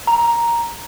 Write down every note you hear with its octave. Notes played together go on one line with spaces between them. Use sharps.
A#5